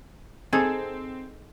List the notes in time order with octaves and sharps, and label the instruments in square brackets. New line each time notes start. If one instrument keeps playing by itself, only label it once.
[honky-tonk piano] C4 [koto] D#4 G#4 A4